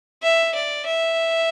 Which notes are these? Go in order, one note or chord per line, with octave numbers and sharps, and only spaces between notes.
E5
D5
E5